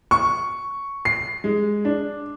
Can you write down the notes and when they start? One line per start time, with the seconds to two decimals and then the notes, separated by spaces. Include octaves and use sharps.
0.11 C#6
1.05 C7
1.44 G#3
1.85 D4